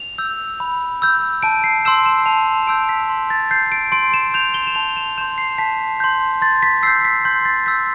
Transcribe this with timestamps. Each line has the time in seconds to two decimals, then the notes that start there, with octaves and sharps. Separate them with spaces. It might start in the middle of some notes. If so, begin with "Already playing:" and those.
Already playing: F7
0.18 E6 G6
0.60 B5
1.02 E6 G6
1.43 A5 D7
1.64 C7
1.84 C6 E6 G6 E7
2.06 E7
2.26 A5 F7
2.63 E7
2.67 C6 E6 G6 D7
2.89 B6
3.09 C6
3.30 A6
3.51 G6 C7
3.72 D7
3.92 C6 D7
4.14 E7
4.34 G6 F7
4.54 G7
4.67 E7
4.75 A5 F7
4.97 E7
5.18 C6 G6 E7
5.38 C7
5.58 A5 B6
6.00 C6 G6
6.42 C6 A6
6.63 B6
6.83 E6 G6 C7
7.05 B6
7.25 C6 G6
7.45 A6
7.66 E6 G6 B6